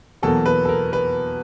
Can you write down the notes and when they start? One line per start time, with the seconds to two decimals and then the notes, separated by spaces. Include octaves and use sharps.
0.22 E2 B2 F#3 A#3 A4
0.46 B4
0.65 A4
0.69 A#4
0.93 B4